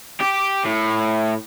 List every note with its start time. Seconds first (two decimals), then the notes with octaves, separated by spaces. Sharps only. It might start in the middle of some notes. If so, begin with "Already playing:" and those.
0.20 G4
0.65 A2